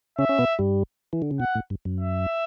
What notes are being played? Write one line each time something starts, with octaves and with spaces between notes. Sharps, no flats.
C#3 C#4 E5
C#4
B2 B3
G2 G3
E3
D3
C#3
B2 F#5
A2
G2
F#2
E5